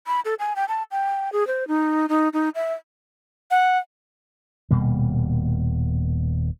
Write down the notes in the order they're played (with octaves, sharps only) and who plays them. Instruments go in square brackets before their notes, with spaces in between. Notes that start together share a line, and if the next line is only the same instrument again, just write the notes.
[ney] B5
A4
G#5
G5
A5
G5
G#4
C5
D#4
D#4
D#4
E5
[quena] F#5
[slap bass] D#1 B2 G3 A#3